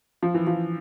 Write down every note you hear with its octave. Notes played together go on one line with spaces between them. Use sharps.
F3
E3
F3